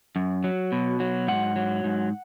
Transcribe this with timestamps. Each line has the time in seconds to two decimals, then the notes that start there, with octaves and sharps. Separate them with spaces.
0.16 F#2
0.44 F#3
0.72 B2
1.00 F#3
1.28 G#2 F#5
1.56 F#3
1.84 G#2